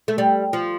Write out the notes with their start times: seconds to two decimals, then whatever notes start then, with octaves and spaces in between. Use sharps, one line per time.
0.08 A3
0.18 G3
0.53 F3